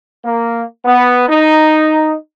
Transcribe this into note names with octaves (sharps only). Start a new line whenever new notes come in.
A#3
B3
D#4